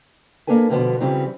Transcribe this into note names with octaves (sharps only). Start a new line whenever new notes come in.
A#3 D4 A4 B4 G#5
G2 B2 D3 F3 B3
C#3 E3 F#3 G3 C4